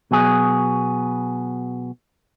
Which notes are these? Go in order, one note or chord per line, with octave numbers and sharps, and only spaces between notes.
B2 F#3 B3 G#4